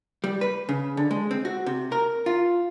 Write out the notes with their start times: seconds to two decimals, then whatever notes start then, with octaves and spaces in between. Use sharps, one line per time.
0.24 G3
0.41 B4
0.69 C#3
0.97 D3
1.11 G#3
1.31 C4
1.45 F#4
1.66 C3
1.92 A#4
2.26 F4